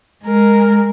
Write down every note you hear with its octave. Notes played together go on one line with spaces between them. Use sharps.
G#3 A#4